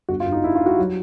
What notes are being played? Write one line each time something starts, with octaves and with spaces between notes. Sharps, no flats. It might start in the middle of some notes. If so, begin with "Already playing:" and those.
G1 F#4
F4
G2
D#4
G2 E4
F4
G3
F#4
F#3